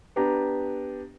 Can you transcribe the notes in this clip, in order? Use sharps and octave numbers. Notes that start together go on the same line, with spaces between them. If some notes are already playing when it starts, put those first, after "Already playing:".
B3 D4 G4 A#5